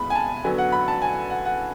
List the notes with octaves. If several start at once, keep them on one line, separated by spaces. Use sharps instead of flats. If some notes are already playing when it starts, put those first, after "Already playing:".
Already playing: B2 G#3 B5
G#5
A5
D3 F#3 B3 G#5
F#5
B5
A5
G#5
F#5
F#5